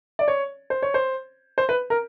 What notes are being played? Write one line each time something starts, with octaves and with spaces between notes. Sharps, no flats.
D5
C#5
C5
C#5
C5
C5
B4
A#4